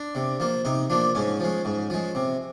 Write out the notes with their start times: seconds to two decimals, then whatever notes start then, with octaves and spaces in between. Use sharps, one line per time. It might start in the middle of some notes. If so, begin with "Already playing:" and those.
Already playing: D4
0.15 C3
0.40 F3 A#3
0.65 C3 D#4
0.90 F3 A#3 D4
1.15 G#2 C#4
1.40 F3 G#3
1.65 G#2
1.90 F3 G#3
2.15 C3